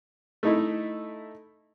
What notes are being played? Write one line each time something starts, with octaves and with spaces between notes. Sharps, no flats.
A3 D#4 E4